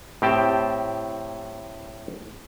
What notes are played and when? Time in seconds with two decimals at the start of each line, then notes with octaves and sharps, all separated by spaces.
0.22 A2 C4 G4 G5 A5